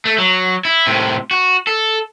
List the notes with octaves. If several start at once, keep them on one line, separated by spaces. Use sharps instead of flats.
A3
F#3
E4
A2 C3
F#4
A4